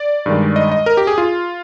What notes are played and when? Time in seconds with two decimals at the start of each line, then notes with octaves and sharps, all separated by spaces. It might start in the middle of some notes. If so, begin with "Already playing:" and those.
Already playing: D5
0.26 G2 D#3 G#3
0.56 D#5
0.71 D#5
0.86 A#4
0.97 G4
1.07 G#4
1.18 F4